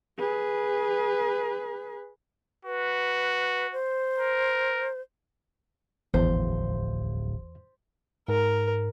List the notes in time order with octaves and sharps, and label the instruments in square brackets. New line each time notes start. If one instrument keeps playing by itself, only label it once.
[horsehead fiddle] G#4 B4
[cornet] F#4 [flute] B4
[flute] C5
[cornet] A#4
[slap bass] D1 F3 F#3 [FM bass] G#1 [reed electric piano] E2 [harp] C5
[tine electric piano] G#2 [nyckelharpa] A#4